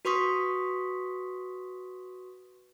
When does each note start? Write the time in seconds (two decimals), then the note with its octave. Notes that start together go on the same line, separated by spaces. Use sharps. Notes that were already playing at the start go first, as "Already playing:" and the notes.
0.05 F#4 B4 C6 C#6 D#6 B6